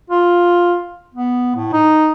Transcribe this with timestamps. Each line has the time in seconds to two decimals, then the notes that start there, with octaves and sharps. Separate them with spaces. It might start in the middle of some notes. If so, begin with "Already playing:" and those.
0.10 F4
1.15 B3
1.55 A2
1.73 D#4